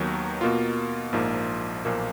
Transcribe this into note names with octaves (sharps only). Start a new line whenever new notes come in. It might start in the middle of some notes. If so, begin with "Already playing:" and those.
Already playing: D#2 D#3 F#3 B3 D#4
B2 A#3 F4
A#1 G#2 F3 A#3
B1 A#2 F3 A#3